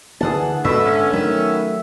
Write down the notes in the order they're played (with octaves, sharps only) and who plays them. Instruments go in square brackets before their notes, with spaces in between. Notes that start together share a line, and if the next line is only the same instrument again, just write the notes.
[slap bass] D2 D3 A#3 [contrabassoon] E3 [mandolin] G#4 F#5 A5
[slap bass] G#2 [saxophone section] B2 [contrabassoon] D3 [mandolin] E5
[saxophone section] B3 C#4
[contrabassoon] D#3 [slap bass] F#3 A3 [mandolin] E5